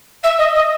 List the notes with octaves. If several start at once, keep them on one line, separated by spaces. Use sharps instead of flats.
E5
D#5
D#5